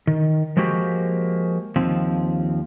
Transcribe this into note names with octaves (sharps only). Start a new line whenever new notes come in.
D#3
F3 G#3 A#3 F#4 G4
D#2 F3 C4